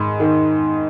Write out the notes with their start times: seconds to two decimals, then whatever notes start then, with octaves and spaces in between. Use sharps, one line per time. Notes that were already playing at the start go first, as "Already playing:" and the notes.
Already playing: G#2 D#3 B5
0.20 D#3